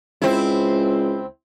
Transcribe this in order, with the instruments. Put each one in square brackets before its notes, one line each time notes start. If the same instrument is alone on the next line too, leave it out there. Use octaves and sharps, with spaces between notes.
[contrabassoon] C#2 [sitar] C4 E4